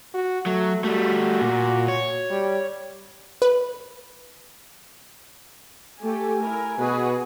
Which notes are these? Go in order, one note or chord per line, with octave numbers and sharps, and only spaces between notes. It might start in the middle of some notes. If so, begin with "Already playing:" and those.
F#4
F#3 A3
G3 A3 F#4
A#2
C#5
G3
B4
A3 G4 A4 G#5
E4 A#4
B2 F#4 G#4 B4